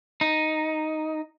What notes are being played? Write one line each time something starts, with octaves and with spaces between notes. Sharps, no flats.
D#4